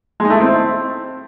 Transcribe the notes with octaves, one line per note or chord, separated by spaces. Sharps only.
G#3
D#4
A3
E4
C4